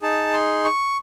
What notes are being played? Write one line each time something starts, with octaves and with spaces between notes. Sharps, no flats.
D#4 G#4 A5
C6
C#6